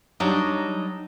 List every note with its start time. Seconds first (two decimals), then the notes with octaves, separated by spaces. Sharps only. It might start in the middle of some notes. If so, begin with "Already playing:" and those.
0.20 F#3 G3 D4 D#4